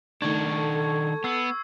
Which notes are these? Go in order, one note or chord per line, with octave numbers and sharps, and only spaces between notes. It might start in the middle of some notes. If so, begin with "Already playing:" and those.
D#3 A3 D4 D#4 C#6 G#6
A4
B3 C#6 E6 C7